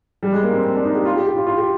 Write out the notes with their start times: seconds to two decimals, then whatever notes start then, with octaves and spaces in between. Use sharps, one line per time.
0.23 G3
0.32 G#3
0.43 A#3
0.53 C4
0.64 C4
0.75 D4
0.84 D#4
0.95 G4
1.05 F4
1.16 G4
1.27 G4
1.36 F4
1.47 F4
1.57 G4